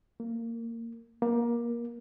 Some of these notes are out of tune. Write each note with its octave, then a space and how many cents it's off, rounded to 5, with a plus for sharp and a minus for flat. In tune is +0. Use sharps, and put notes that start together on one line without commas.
A#3 -20
A#3 +20